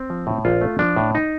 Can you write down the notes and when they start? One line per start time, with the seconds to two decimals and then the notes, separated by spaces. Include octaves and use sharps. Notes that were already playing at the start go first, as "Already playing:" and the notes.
Already playing: C4
0.10 F3
0.27 A2
0.45 A#1 F4
0.61 A3
0.79 F3 D4
0.96 A2
1.15 D#4